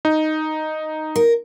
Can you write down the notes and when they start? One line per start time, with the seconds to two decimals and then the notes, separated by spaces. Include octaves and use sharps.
0.05 D#4
1.16 A#4